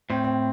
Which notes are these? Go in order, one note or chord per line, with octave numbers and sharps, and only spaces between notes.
A2 C4
C4